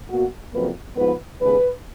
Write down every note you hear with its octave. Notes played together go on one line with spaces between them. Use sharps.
B2 A#3 F#4
F2 C#3 F#3 A#3 B4
G#2 F3 B3 B4
D#2 C#3 G#3 B3 B4